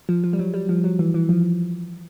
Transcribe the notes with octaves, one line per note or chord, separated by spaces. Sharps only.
F3
F3
G3
F#3
G3
F3
F#3
E3
E3
F3